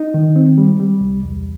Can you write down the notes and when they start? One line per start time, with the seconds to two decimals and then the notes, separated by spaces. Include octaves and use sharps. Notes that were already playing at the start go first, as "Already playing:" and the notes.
Already playing: D#4
0.14 D#3
0.36 C4
0.58 G3
0.80 G3
1.01 C2
1.23 E2